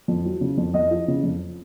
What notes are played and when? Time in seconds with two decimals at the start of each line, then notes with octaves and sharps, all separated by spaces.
0.08 F2
0.25 F#3
0.41 C#3
0.57 F2
0.74 F2 D#5
0.91 F3
1.08 C#3
1.23 F2